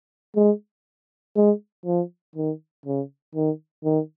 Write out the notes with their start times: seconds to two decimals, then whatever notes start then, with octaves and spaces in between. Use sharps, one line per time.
0.36 G#3
1.36 G#3
1.86 F3
2.36 D#3
2.86 C#3
3.35 D#3
3.84 D#3